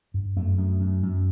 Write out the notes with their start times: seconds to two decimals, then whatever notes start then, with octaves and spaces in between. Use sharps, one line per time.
0.14 G2
0.36 F#2 A3
0.58 F#2
0.80 F#2
1.03 F#2